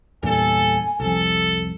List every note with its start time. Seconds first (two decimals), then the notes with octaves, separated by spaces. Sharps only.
0.23 E2 G2 A#2 A4 G#5
1.00 C2 F2 A4